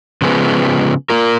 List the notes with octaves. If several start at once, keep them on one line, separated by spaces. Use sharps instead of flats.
C#3 F3 G#3 B3
A#3 F4 A#4